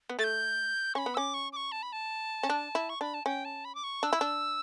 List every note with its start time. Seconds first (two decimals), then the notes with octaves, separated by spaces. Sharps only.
0.09 B3
0.19 A3 A6
0.24 G6
0.95 C#4 B5 C#6
1.06 B3
1.14 C#4 D6 E6
1.34 C#6
1.53 D6
1.56 C#6
1.72 A5
1.83 B5
1.93 A5
2.43 C#4
2.49 D4
2.75 E4
2.89 C#6
3.01 D4 B5
3.14 A5
3.26 C#4 G5
3.45 A5
3.65 B5
3.75 D6
3.84 C#6
4.03 D4 E6
4.13 E4
4.21 D4